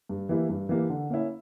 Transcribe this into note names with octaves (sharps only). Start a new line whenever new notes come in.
G2
E3 A#3 E4 G4
G2
E3 A#3 E4 G4
D3
A#3 C#4 E4